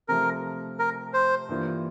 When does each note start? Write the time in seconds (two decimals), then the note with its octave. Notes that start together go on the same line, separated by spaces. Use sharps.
0.08 C3 F3 A3 A#4
0.79 A#4
1.14 C5
1.49 G2 E3 A#3 F4